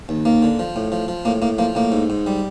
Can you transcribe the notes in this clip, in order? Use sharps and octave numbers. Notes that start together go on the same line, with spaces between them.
D#2
D#2 A#3
D3
F3
A2
F3
F3
A2 A#3
A2 A#3
F3 A#3
A2 A#3
G#2
G#2
G3